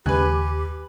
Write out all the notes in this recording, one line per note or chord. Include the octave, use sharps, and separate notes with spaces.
D#2 C#3 G#3 G4 B4 G#5 F#6